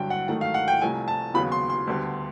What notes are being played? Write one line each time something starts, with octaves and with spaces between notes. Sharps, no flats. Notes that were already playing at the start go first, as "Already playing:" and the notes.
Already playing: G2 D3 F#3 G5
F#5
G#2 D#3 F#3 A3 F#5
F5
F#5
G5
C2 C3 F3 A3 G#5
A5
D#2 C#3 F#3 B3 B5
C6
C6
D2 D3 G3 B3